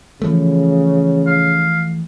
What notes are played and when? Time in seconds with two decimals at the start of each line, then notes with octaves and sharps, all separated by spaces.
0.22 C#3 E3 F3 A3
1.27 F5